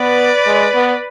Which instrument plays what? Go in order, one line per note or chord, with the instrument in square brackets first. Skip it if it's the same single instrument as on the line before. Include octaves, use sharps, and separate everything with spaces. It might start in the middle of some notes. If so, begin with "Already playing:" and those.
Already playing: [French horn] B3 [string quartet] B4 D5
[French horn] G#3
B3